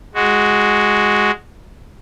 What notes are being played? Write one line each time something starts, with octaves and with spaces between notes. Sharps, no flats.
G#3 F#4